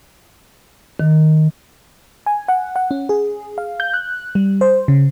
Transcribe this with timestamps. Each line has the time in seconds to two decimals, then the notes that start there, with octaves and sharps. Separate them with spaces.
1.00 D#3
2.26 G#5
2.48 F#5
2.76 F#5
2.91 C#4
3.09 G#4
3.58 F5
3.80 G6
3.94 F#6
4.35 G3
4.61 C5
4.88 C#3